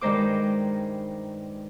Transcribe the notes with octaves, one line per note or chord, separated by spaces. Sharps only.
G2 D#3 G#3 D#4 C5 D6